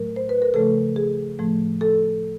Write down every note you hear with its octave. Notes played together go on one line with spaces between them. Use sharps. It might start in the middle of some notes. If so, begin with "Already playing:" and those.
Already playing: A2 F#3 A3 A#4
C5
B4
A#4
C#3 F3 A3 A4
G#4
A2 F3 A3
A4